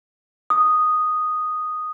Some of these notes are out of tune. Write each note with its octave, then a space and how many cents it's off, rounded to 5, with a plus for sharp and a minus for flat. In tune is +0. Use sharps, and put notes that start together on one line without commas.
D#6 -5